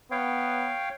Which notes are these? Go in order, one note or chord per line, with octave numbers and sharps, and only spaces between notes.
B3 C#5 F5 G5